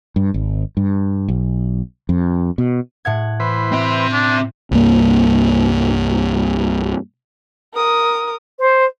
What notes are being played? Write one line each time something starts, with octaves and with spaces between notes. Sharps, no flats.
G2
G#1
G2
B1
F2
B2
A2 F#5 G#6
E3 B4 C5
C4 E5
D4
C2 G2 A#3
A#4 D#6
C5